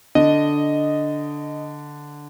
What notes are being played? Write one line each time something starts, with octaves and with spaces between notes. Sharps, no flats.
D3 D#5